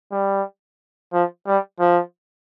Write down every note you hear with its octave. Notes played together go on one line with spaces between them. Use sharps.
G3
F3
G3
F3